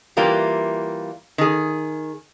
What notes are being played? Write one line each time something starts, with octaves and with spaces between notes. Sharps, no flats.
E3 G3 A#3 F4
D#3 G#4